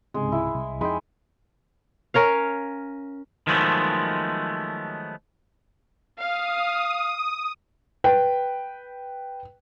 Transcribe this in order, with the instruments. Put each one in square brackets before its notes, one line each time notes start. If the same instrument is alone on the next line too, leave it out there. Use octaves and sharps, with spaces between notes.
[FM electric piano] C#2 G#2 C3 [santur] G#3
[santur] E4
[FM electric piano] C2
[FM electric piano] F2 D#4 G5 [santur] G#3 B5
[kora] C#4 A#4 C#5 F5
[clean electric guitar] D#3 F3 F#3 G#3 A3 B3
[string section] F5 [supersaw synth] D#6
[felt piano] B4 G5